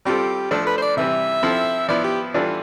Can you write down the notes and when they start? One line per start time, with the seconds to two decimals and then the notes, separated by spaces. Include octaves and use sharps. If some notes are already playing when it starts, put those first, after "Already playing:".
0.05 G3 C4 F4 G4 A4
0.51 F3 A3 D4 A4
0.66 B4
0.78 C5
0.82 D5
0.97 C3 E3 G3 E5
1.43 F3 C4 E4 A4
1.88 F3 B3 E4 D5
2.04 G4
2.34 E3 G3 D4 F4 A4